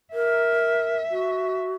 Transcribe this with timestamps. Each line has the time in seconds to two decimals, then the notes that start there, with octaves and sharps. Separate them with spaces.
0.14 A#4 E5
1.11 F#4